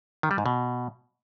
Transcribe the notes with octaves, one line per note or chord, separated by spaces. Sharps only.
D#3
G3
G#2
B2